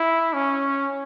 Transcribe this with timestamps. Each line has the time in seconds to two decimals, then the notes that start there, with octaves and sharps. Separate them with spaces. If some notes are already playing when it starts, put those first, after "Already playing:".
Already playing: E4
0.34 C#4